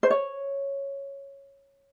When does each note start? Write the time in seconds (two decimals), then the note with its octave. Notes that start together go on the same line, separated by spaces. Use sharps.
0.03 C5
0.10 C#5